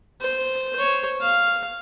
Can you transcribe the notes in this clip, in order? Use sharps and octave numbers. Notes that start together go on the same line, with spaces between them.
C5
C5 C#5
F5